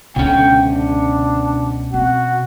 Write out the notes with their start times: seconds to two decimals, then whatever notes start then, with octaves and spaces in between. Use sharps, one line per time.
0.16 C#2 B2 D3 C#4 G5
0.66 D4
1.94 C4 F#4